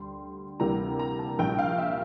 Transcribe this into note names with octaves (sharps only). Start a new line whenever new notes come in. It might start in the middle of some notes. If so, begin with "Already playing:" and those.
Already playing: D2 D3 G3 C6
D2 C3 E3 G3 A#3 A#5
A#5
A5
A#1 A#2 G3 G5
F5
E5